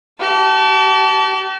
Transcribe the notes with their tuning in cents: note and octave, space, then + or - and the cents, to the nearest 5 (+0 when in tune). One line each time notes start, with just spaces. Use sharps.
G4 -45 A5 -10